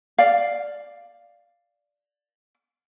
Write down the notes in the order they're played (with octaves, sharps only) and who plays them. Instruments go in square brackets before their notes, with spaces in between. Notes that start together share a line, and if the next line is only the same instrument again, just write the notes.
[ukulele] D5 F5